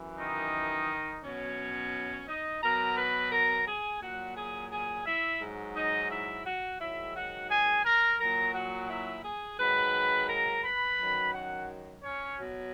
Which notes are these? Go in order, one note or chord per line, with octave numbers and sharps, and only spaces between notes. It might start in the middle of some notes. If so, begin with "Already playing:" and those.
Already playing: F#2 E3
D#3 D#4
B2 F#3 C#4 C#5
D#4 D#5
B2 F#3 A#4 A#5
B4 B5
A#4 A#5
G#4 G#5
A#2 F#3 F#4 F#5
G#4 G#5
G#4 G#5
E4 E5
G#2 F#3
D#4 D#5
E4 E5
F#4 F#5
G#2 D#3 F#3 E4 E5
F#4 F#5
G#4 G#5
A#4 A#5
A#2 F#3 A#4 A#5
F#4 F#5
E4 E5
G#4 G#5
G#2 D#3 F#3 B4 B5
A#4 A#5
B4 B5
F#2 D#3 F#3
F#4 F#5
C#4 C#5
B2 F#3